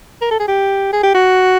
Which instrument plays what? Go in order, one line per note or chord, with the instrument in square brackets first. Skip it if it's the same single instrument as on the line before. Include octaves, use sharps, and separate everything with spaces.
[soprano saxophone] A#4
A4
G#4
G4
G#4
G4
F#4